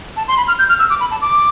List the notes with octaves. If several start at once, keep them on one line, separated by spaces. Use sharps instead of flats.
A5
C6
B5
F6
G6
F6
E6
D6
B5
A5
D6